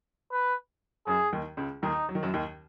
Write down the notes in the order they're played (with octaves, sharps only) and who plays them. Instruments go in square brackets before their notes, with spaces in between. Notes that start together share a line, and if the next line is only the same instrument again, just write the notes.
[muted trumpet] B4
[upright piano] F#2 F#3 [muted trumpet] G#4
[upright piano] D#2 D#3
C#2 C#3
[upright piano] D#2 D#3 [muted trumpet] D#4
[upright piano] F#3
D#3
F#2 F#3
D#2 D#3